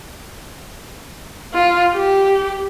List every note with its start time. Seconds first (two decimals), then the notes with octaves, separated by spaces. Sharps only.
1.54 F4
1.93 G4